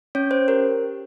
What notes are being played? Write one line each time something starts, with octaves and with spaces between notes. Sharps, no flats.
C#4 C#5
C5
G4 A#4